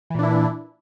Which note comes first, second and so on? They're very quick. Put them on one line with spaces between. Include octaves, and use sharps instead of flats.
E3 A#2 D4 E4